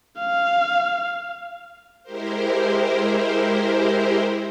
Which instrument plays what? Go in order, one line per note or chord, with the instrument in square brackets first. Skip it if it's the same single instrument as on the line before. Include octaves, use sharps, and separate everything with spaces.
[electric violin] F5
[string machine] G#3 E4 G4 A#4 C5